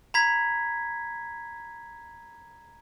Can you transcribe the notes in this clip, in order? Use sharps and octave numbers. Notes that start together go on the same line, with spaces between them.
A#5 B5 G#6 B6